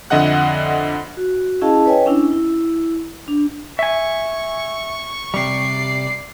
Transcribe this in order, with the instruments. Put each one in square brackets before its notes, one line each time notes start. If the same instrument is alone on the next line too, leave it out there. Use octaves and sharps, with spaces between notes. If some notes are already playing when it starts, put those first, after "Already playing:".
[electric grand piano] F2 D3 D#5 E5 F#5 F#6
[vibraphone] F#4
C#4 E4 G#4 D#5 F5 A5
B4 C#5 D#5 G5 G#5
C#4 D4 E4
E4
D4
[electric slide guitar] E5 G#5 [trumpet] C#6
[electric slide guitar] C3 G3 [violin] D5 C7